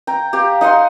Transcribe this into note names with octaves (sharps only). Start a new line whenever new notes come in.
G5 A#5
G4 F5 G5
D#4 D#5 F#5 C6